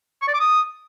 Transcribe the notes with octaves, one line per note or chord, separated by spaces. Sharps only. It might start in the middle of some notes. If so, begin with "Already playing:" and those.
C#6
D5
D6
D#6